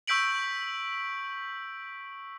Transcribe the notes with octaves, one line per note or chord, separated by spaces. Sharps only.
C#6 E6 G6 B6 D7 F#7